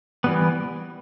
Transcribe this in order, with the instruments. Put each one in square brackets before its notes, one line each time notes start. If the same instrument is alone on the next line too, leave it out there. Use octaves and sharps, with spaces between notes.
[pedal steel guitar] E3 G3 B3